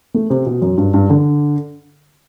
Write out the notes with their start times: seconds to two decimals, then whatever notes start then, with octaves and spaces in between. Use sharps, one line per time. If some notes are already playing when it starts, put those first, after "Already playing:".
0.14 A3
0.30 C3
0.46 B2
0.62 F#2
0.78 G2
0.94 G2
1.10 D3